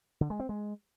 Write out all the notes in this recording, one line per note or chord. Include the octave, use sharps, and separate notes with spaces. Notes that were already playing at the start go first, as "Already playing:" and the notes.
D3
G#3
C4
G#3